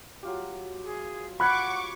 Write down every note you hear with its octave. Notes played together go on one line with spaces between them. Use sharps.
F#3 F4 G4
G#4
F#5 B5 C#6 D6 F#6 G#6